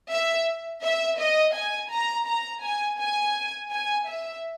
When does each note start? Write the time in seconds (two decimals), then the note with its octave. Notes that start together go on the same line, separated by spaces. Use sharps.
0.11 E5
0.84 E5
1.19 D#5
1.55 G#5
1.91 A#5
2.27 A#5
2.63 G#5
2.99 G#5
3.72 G#5
4.08 E5